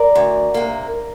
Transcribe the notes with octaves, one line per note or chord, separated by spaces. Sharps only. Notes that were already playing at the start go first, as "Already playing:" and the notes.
Already playing: A#4 D5
D2
C3 A#3